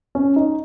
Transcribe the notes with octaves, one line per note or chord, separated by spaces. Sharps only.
C#4
D#4